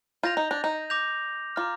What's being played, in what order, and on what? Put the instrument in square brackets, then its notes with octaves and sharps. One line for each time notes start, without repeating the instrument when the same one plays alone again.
[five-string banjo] F4 [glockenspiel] G6 A#6 F7
[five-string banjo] D#4
D4
D#4
[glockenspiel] D6 G6 A#6 F7
[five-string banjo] F4 [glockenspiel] A#5 D6 F6